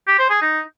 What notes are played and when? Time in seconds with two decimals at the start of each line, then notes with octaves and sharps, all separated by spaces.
0.07 G4
0.18 C5
0.30 G#4
0.41 D#4